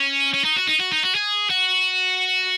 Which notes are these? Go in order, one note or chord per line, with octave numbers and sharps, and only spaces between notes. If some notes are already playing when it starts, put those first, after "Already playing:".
Already playing: C#4
C#4
D#4
F#4
D#4
F#4
D#4
F#4
G#4
F#4